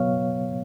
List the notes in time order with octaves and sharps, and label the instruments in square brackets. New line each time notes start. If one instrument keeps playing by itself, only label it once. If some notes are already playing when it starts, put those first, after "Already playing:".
Already playing: [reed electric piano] B2 F#3 B3 C#5 F5